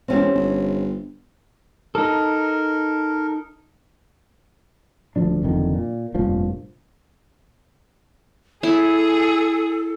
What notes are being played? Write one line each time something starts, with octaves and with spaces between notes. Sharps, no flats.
E1 C4 C#4 G4
G1
D#4 A4 A#4
D#1 D2 F3 D4
F#1 F2 D3 D#3
A#2
F1 G2 A#2 F3
E4 G#4 A4